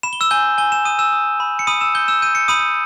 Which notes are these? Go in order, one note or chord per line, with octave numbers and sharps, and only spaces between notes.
B5 E7
G7
E6 E7
G#5 G6 G7
G#5 G7
E7
D#6 D#7
E6 E7
D#6
B5
C#7
B5 D#6 D#7
E6 E7
G6 G7
E6 E7
G6 D#7
C#7
B5 D#6 D#7